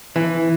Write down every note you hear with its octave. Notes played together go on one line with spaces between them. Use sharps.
E3